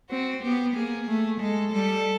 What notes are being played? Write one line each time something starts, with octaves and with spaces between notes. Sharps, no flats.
C4 F#4
B3 G4
A#3 G#4
A3
G#3 A4
G3 A4